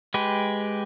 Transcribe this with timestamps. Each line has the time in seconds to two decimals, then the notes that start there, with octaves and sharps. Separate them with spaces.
0.14 G#3 G4 B4